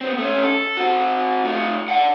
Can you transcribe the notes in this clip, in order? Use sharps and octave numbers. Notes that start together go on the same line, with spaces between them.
B3 C4
A3 C#4
A4
C4 F#4
A3 F4
D5 F#5